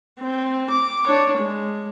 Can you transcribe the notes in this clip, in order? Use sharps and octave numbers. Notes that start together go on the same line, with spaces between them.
C4
D6
D4 C#5
G#3